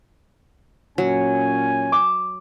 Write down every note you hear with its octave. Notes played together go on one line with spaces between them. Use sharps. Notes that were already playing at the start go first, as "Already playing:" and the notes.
A#2 F#3 C#4 G#5
D6 E7